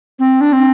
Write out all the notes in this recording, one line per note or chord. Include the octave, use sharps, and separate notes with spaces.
C4
D4
C4